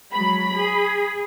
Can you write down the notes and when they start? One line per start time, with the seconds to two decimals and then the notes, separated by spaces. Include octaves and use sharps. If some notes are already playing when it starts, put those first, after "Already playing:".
0.12 F#3 G#3 B5
0.54 G#4